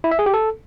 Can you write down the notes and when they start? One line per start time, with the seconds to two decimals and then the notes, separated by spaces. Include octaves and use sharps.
0.04 E4
0.11 E5
0.19 G#4
0.26 G4
0.34 A4